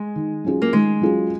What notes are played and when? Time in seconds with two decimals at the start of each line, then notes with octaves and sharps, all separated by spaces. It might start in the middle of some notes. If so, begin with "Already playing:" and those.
Already playing: G#3
0.16 D#3
0.44 F#3 C#4 F4 G#4
0.62 A#3
0.73 D#3 G#3
1.01 F#3 C#4 F4 G#4